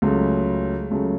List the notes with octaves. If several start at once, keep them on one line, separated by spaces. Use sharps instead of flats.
C#2 C#3 F#3 A3
C#2 C#3 F#3 A3